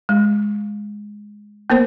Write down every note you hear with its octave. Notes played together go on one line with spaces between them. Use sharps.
G#3
A#3 B3 A#4 C5